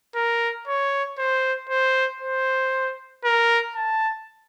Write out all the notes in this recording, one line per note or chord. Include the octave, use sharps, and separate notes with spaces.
A#4
C#5
C5
C5
C5
A#4
A5